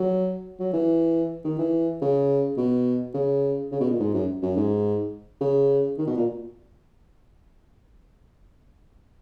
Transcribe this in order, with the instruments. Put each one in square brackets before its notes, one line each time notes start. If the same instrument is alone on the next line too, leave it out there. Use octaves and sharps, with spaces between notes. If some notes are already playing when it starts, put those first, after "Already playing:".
Already playing: [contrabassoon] F#3
F#3
E3
D#3
E3
C#3
B2
C#3
C#3
B2
A#2
G#2
F#2
F#2
G#2
C#3
D#3
B2
A#2